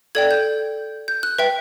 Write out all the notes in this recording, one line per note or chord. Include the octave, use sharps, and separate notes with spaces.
A4 D5 G5 G#6
G6
G6
F#6
B4 E5 G5